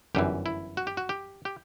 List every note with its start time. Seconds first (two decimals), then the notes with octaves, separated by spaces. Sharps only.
0.15 G1 F#2 E3 G4
0.46 E4
0.77 F#4
0.87 G4
0.97 F#4
1.09 G4
1.45 G4